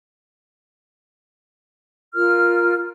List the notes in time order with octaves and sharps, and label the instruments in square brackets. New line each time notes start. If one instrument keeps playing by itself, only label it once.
[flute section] F4 A#4 F6